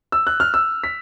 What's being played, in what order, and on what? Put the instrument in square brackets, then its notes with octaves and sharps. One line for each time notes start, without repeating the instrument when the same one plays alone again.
[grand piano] E6
F#6
F6
E6
B6